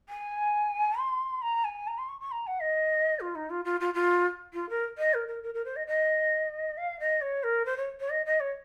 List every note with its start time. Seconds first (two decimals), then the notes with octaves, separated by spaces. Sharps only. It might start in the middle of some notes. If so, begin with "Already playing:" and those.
0.09 G#5
0.98 C6
1.42 A#5
1.64 G#5
1.87 A#5
1.98 C6
2.09 C#6
2.20 C#6
2.31 A#5
2.47 F#5
2.61 D#5
3.20 F4
3.35 D#4
3.50 F4
3.65 F4
3.80 F4
3.94 F4
4.53 F4
4.69 A#4
4.98 D#5
5.14 A#4
5.28 A#4
5.43 A#4
5.54 A#4
5.65 C5
5.76 D#5
5.87 D#5
6.77 F5
6.99 D#5
7.21 C#5
7.43 A#4
7.65 C5
7.77 C#5
8.00 C#5
8.10 D#5
8.26 D#5
8.40 C#5